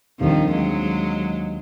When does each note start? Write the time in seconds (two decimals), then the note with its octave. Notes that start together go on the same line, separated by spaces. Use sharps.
0.20 D#2 D3 D#3 F3 G3 C4
0.51 F#3 G#3